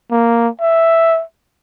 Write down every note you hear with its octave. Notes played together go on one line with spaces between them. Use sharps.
A#3
E5